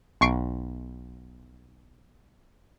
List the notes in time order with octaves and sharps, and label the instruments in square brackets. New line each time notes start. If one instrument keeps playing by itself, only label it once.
[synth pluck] B1 C#6 C7 D7